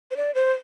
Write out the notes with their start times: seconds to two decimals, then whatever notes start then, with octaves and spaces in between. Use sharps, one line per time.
0.11 C5
0.17 D5
0.35 C5